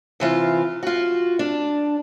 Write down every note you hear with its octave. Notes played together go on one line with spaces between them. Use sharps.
C3 E3 F4 F5
F4 F#4
D4